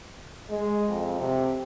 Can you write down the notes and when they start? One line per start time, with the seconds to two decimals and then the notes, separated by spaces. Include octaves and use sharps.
0.50 G#3
0.89 F2
1.19 C3